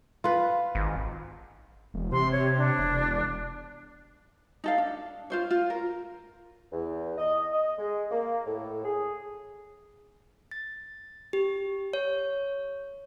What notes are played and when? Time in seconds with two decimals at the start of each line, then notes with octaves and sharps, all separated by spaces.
0.24 F4 B4
0.75 G#1
1.94 E1
2.12 C3 C6
2.32 C#5
2.56 D4
2.78 E1
4.64 D#4 A4 F5
4.78 D4
5.30 F4 C5 C#5
5.50 F4
5.70 A#4
6.72 E2
7.18 D#5
7.53 D#5
7.78 G#3
8.11 A#3
8.46 A2
8.85 G#4
10.51 A6
11.33 G4
11.93 C#5